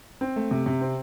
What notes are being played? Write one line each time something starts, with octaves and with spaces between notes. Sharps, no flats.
C4
A3
C3
C3
C4